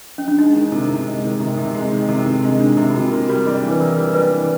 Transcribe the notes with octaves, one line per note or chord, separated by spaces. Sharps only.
C#4
D4
G#3 D#4
D#3
C3
C3
G#3
D#3
C3
C3
G#3
D#3
C3
C3
G#3 D4
D#3 D4
C3 E4
F4
C3 F#4
A#3 G4
G3 F#4
D4 G#4
E3
B4
A#3 A#4
G3
D4 B4
E3